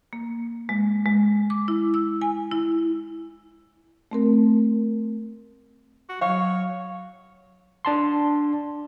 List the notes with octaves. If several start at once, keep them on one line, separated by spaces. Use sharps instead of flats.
A#3
G#3
G#3
D6
E4
E6
G#5
E4
A3 C4 A#4
F#4
F#3 C#5 F5 C#6
D4 A5 C6